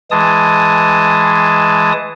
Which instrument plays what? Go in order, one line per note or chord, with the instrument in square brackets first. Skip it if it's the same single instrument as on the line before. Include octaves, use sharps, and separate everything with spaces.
[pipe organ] E3 G#3 A5 D#6